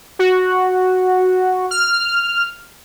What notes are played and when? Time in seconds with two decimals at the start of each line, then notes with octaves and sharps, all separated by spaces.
0.19 F#4
1.71 F6